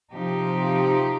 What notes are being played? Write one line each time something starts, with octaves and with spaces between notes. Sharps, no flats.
C3 F3 D#4 G4